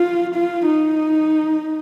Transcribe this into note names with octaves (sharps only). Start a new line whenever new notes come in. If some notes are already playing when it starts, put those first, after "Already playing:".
Already playing: F4
F4
D#4